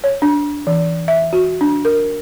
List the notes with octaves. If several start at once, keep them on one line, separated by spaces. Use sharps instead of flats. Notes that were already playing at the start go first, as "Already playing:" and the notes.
C#5
D4
E3
E5
F#4
D4
A#4